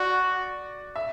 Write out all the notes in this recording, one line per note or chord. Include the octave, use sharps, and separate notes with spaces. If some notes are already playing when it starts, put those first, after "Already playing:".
Already playing: F#4 D5
E5